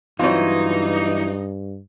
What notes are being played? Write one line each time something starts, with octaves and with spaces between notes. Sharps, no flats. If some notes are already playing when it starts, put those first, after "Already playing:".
G2 E3 F#3 C4 D#4 F4